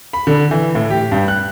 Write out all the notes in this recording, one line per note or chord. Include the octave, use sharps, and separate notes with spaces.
B5
D3
E3
A2
G4
G2
F#6